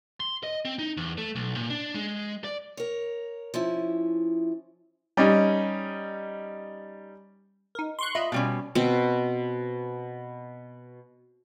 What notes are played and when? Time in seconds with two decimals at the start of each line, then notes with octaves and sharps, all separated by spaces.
0.20 C6
0.43 D#5
0.65 C4
0.79 D#4
0.97 E2
1.18 A3
1.36 B1
1.56 A#2
1.70 D4
1.94 G#3
2.44 D5
2.77 A#4 C#5
3.54 F3 C#4 E4
5.17 G3 C#4 D#4
7.75 D#4 A#4
7.99 C6 C#6 F#6
8.15 F4 D#5 E5 B5
8.32 B2 G3 C#4
8.75 B2 C4